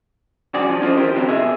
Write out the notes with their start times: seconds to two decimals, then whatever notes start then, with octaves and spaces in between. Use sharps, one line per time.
0.54 C2 F2 C#3 F#4 G#4 D5
0.69 F3
0.81 C#4 F4 A4 A#4 C5 D#5
0.97 E3 G4 A#4 C5
1.14 C#3 F3 F#3 B3 C4 A#4
1.28 B2 G#4 D#5 E5